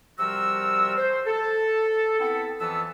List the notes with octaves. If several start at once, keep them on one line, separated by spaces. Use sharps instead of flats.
C3 F3 G3 F#4 A#4 E6
C5
A4
B3 C4 E4 A4
F2 E3 F3 B3 A5 E6